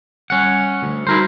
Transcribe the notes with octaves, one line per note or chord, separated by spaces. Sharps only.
G3 C#4 F#5
D2
G3 D#4 E4 F#4 A#4 C5